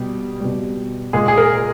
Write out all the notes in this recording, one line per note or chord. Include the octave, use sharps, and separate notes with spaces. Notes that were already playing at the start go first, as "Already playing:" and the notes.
Already playing: B2 G3 G4
B2 G3
A#2 G#3 G#4
G#4
A#4